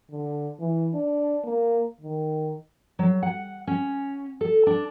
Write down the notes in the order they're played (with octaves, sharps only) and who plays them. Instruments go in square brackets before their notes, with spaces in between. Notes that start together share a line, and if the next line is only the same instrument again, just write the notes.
[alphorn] D3
E3
D4
A#3
D#3
[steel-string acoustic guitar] F#3
F#5
C#4
A4
D4